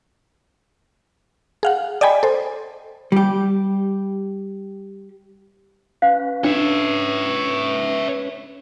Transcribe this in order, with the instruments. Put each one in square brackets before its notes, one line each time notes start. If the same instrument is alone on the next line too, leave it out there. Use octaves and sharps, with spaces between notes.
[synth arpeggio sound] G#4 F5 F#5
D5 D#5 G5 G#5 B5
A4 C5
[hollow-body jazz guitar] G3 G4
[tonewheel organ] C#4 B4 [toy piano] F5
[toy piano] D4 [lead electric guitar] C#5 E5